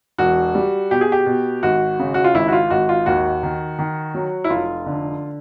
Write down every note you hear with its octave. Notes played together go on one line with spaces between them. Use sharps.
E1 F#4
G3
B2 G4
G#4
G4
B2
G#1 F#4
C#3
F#4
F4
G#1 E4
F#4
F4
G#1 F#4
F4
D#2 F#4
D#3
D#3
F#3
E4
F1 F4
D3